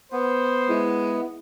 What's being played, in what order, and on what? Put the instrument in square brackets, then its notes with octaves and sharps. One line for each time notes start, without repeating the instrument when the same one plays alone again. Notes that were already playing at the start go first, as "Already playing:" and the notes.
[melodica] B3 [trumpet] C5
[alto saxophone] G#3 [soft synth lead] E4